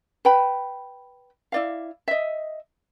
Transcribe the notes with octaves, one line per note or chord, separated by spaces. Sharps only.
B4 G5 B5
E4 D5 F5
D#5 E5